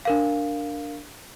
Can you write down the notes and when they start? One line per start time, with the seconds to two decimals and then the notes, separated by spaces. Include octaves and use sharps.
0.05 D4 A#4 F5